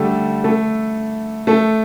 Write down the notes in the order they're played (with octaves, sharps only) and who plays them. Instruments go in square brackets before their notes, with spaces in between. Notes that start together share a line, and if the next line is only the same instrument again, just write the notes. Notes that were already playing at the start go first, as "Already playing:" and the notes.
Already playing: [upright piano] D3 G3 A3 D4 G4 A4
A3 A4
A3 A4